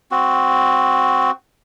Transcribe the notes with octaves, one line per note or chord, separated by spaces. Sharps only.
C4 F#4